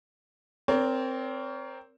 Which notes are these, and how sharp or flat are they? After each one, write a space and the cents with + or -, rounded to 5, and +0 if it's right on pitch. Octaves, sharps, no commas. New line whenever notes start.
C4 +0 A#4 +0 C#5 +40